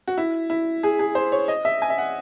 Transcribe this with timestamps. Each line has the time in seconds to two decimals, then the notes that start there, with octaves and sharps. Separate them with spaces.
0.08 F#4
0.18 E4
0.50 E4
0.83 G#4
0.99 G#4
1.15 C5
1.32 C#5
1.48 D#5
1.65 E5
1.82 G#5
1.90 E5
1.98 F#5